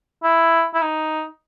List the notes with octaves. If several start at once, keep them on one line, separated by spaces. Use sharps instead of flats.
E4
E4
D#4